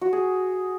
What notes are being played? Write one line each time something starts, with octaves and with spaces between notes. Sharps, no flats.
F#4
G#4